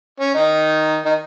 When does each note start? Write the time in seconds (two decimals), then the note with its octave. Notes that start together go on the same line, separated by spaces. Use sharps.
0.20 C#4
0.34 D#3 D#4
1.05 D#3 D#4